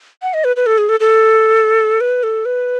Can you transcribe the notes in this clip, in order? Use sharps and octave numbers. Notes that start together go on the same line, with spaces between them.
F#5
D#5
B4
B4
A4
G#4
A4
A4
B4
A4
B4